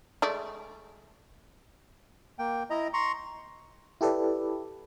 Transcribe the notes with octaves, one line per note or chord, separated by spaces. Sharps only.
G#3 A3 D5
A#3 G5
E4 D#5 A#5
A#5 C6 C#6
E4 G4 A4 B4 D5